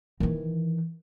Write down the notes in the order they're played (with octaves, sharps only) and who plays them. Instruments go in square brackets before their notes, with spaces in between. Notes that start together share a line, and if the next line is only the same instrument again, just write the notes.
[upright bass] D#3 E3